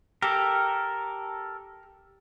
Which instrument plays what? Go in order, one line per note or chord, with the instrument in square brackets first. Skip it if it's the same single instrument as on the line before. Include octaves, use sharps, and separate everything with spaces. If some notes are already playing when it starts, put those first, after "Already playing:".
[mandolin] G4 [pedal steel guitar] A4 A#4